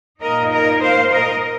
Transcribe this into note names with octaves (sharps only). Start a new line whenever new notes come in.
A#2 A#3 D#4 A#4 D#5
A#4 D#5
C5 F5
A#4 D#5